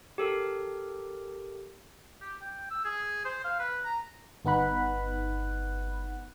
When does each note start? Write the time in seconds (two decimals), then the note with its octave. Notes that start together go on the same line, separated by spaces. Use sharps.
0.18 G4 A4 A#4
2.21 G4
2.42 G5
2.71 E6
2.85 G#4
3.25 C5
3.44 F5
3.59 B4
3.85 A#5
4.45 G1 B3 D#4 F#5 B5 F#6